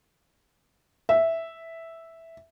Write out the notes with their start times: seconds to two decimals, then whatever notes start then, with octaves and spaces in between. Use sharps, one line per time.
1.09 E5